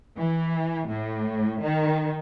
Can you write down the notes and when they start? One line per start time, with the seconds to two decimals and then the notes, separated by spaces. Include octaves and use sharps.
0.17 E3
0.87 A2
1.62 D#3